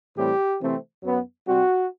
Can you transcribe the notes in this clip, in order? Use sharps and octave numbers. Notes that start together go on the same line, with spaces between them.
A2 E3 G3 C4 G4
C3 E3 A3 C4
F#2 F#3 B3
C3 G3 C4 F#4